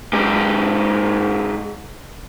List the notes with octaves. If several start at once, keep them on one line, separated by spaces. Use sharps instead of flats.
G#2 G4